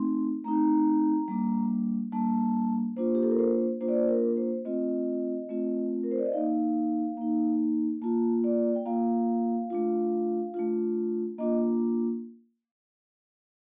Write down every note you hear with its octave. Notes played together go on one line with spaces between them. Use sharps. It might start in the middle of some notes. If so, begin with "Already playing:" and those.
Already playing: A3 C4 D#4 C6
A3 C4 D#4 A#5
G3 A#3 D4
G3 A#3 D4 A5
A#3 D4 F4 C5
G4
A4
A#4
C5
A#3 D4 F4 C5
D5
C5
A#4
C5
A3 C4 F4 D#5
A3 C4 F4
A#4
C5
D5
D#5
A#3 D#4 F5
A#3 D#4
A#3 F4 A5
D5
G5
A#3 F4 F5
A3 D4 F4
A3 D4 F4
A#3 D4 F4 D#5